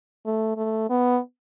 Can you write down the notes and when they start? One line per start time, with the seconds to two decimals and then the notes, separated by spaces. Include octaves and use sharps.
0.26 A3
0.57 A3
0.90 B3